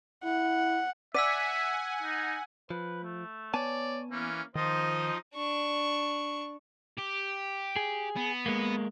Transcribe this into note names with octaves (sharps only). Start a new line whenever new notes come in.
E4 F#5
D5 E5 F#5 G#5 E6 B6 D#7
D#4
F3 B4
A3
B3 C#5 D5 G#5 A5
E3 A#3 C#4
D#3 F3 D#4 F4 C5 D#5
D4 C#6
G4
G#4
B3
G#3 A#3